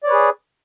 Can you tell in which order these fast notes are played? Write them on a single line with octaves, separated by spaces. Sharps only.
D5 C#5 B4 G#4